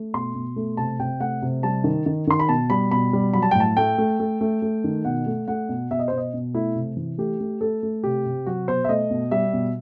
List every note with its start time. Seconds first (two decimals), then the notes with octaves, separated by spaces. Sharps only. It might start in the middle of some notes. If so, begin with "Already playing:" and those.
Already playing: A3
0.14 B2 C6
0.35 B2
0.56 A3
0.77 C3 A5
0.99 C3 G5
1.20 A3 F#5
1.42 C3
1.63 G3 A5
1.84 D#3
2.06 D#3
2.27 D#3 C6
2.40 B5
2.49 B2 A5
2.70 G3 B5
2.91 B2 B5
3.13 G3
3.33 F#3 B5
3.42 A5
3.51 G5
3.55 A2
3.60 A5
3.77 A3 G5
3.98 A3
4.20 A3
4.41 A3
4.62 A3
4.84 D#3
5.05 B2 F#5
5.26 A3
5.48 A3 F#5
5.69 B2
5.91 B2 E5
5.99 D#5
6.08 C5
6.12 B2
6.18 D#5
6.34 B2
6.54 A3 E4
6.75 C3
6.97 E3
7.18 A3 G4
7.40 A3
7.61 A3 A4
7.83 A3
8.04 C3 G4
8.26 C3
8.46 F#3 F#4
8.68 B2 C5
8.84 E5
8.89 A3 D#5
9.10 B2
9.31 G3 E5
9.53 B2